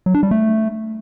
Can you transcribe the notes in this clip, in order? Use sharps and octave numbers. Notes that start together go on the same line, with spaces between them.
F#3
D4
G3
A3